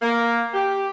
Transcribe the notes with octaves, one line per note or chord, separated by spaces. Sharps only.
A#3
G4